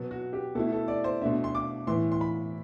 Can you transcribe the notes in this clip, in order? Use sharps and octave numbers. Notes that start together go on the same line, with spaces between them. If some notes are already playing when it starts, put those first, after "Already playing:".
Already playing: B2 F#3 B3
F#4
G4
B2 A3 E4 A4
A4
D5
C5
B2 A3 D4 E5
C6
D6
A2 E3 B3 C6
C6
B5